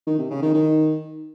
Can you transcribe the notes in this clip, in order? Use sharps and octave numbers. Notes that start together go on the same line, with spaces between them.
D#3
C3
C#3
D#3
D#3